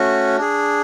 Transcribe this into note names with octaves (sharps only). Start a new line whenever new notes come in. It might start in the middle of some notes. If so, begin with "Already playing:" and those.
Already playing: A3 C#4 F#4
D4 G#4